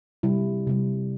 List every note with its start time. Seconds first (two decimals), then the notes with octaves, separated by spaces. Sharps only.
0.23 C3 G3 E4
0.67 C3 G3